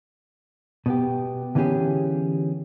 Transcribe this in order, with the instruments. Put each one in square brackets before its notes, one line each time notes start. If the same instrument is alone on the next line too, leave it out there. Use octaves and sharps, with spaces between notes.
[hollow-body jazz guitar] B2 B3 G4
D3 E3 B3 C#4 G4 G#4